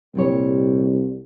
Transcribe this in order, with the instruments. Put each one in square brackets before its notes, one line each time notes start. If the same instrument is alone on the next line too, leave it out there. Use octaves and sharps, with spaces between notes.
[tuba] C2 [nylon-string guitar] A#2 G3 C#5